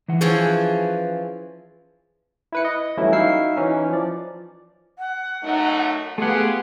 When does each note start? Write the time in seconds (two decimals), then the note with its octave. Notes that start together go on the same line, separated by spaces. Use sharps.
0.08 E3 F#5
0.21 E3 F3 C#4 G#4 B4
2.52 E4 B4 C#7
2.65 D#5
2.97 E3 F#3 G3 A3 C#4 E4
3.12 D#4 E4 F#4 F5 E6 C7
3.56 E3 C#4 D#4
3.90 F3 D5
4.99 F#5
5.43 F#2 A3 D#4
6.18 A3 B3 F4 G4 G#4 F#5